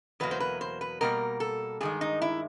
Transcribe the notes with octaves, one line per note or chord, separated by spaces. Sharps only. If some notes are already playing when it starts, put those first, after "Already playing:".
E2 B2 F#3 A#3 B4
C5
B4
C5
B4
B2 G3 A#3 A#4
A4
G2 D#3 G#3 G#4
D#4
E4